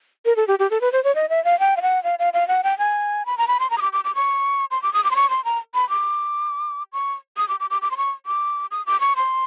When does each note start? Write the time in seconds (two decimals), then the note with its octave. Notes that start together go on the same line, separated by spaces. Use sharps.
0.26 A#4
0.36 A4
0.48 G4
0.59 G4
0.71 A4
0.81 B4
0.92 C5
1.04 C#5
1.15 D#5
1.29 E5
1.45 F5
1.60 G5
1.77 F5
1.82 F#5
2.04 F5
2.19 F5
2.33 F5
2.48 F#5
2.64 G5
2.78 G#5
3.26 B5
3.38 A#5
3.48 B5
3.60 C6
3.70 A#5
3.78 D#6
3.82 D6
3.93 D6
4.04 D6
4.15 C#6
4.71 C6
4.82 D6
4.93 D#6
5.04 D6
5.11 C6
5.16 C#6
5.30 C6
5.45 A#5
5.74 B5
5.90 D6
6.93 C#6
7.37 D#6
7.48 D6
7.60 D6
7.70 D6
7.82 D6
7.91 C6
7.97 C#6
8.26 D6
8.71 D#6
8.86 D6
9.00 C#6
9.16 C6